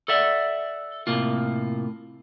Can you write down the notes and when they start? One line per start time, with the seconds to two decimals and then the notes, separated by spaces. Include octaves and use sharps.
0.08 A4 D5 E5 F#5
1.07 A2 C3 A#3 F4